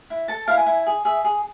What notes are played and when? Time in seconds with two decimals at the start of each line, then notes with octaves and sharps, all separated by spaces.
0.10 E4
0.28 A4 A5
0.48 E4 F5
0.57 G#5
0.66 E4
0.86 G#4
1.05 G#4 E5
1.24 G#4